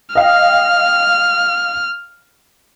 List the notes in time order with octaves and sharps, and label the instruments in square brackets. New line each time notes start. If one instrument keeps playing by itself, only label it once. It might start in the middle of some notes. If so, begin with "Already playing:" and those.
[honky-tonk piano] D#5 F5 G5 [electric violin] F6